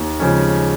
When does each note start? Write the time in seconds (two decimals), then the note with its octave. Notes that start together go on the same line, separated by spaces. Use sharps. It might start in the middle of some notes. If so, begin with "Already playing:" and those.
Already playing: D#2
0.20 C#3 F3 G#3 C#4